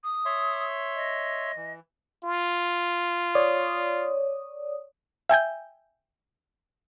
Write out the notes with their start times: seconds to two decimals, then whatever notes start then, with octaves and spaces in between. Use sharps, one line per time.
0.03 D#6
0.25 C#5 E5 C6
0.95 D#5
1.56 E3
2.24 F4
3.35 C#5 D5 D#6
5.29 E5 G5 G#5 G6